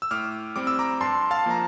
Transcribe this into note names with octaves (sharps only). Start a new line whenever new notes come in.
E6
A2 D6 F6
G3 C4 D6
E6
A#5 D6
G2 A5 C6
F5 A5
F3 A#3 A#5